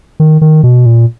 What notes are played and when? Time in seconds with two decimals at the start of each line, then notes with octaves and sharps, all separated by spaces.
0.20 D#3
0.41 D#3
0.63 B2
0.86 A#2